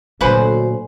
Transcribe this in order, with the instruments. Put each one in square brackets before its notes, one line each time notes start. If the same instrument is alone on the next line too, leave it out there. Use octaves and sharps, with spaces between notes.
[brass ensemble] D2 [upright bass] A#2 F#3 [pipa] C#4 B4 C5